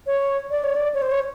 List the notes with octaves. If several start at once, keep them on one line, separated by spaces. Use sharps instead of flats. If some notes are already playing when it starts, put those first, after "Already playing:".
C#5
D5
C#5
D5
C#5
C5
C#5